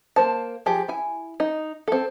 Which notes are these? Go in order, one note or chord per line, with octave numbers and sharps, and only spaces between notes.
A#3 C5 A5
F3 G4 G#4
E4 G#5
D#4
C4 A4